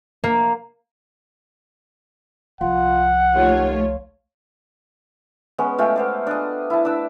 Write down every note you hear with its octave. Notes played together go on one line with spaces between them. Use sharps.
A#3
C2 F3 F4 F#5
D#2 A3 F4 C#5
G#3 B3 C#4
G#3 A3 F4 G5
B3 C5 D5
D4 D#5
E4 A5
D4 E6